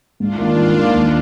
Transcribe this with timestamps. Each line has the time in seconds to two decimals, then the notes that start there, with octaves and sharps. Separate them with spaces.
0.20 G#2 D4 F4
0.38 D#3 A#3
0.57 G#2
0.75 D#3 A#3
0.93 D#2